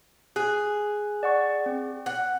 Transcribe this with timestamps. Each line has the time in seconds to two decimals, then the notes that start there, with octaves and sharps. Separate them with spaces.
0.36 G#4 F#6
1.23 D5 F#5 C#6
1.66 C4
2.06 F#5